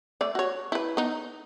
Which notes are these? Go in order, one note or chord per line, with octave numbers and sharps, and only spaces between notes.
A3 D5
F#4 C#5
E4 B4
B3 D#4